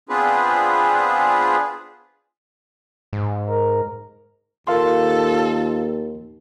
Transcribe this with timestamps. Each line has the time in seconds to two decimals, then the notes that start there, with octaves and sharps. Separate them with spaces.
0.09 B3 C4 D4 F4 G#4 B4
3.13 G#2
3.49 A#4
4.67 D#2 F4 A4 A#4 F5 C6